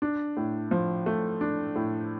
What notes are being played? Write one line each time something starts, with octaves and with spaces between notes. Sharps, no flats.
D4
A2
F3
A3
D4
A2